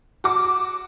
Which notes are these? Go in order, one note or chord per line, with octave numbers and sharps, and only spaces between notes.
F#4 D6